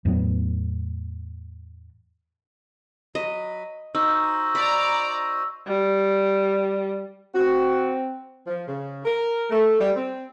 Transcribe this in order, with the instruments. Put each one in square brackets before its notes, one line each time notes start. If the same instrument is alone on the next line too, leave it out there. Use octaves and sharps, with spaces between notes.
[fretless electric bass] E2 A2 F#3 B3
[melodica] F#3 B5 [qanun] D#5
[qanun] D#4 [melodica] F#4 C5 D#5 [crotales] E6
[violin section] D5 A#5 [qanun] B5
[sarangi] G3
[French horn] C4 [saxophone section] F#4
[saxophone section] F3
C#3
A#4
A3
G3
C4